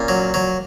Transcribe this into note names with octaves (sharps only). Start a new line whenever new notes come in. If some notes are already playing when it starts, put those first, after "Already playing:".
Already playing: A#2 C#4
F#3
F#3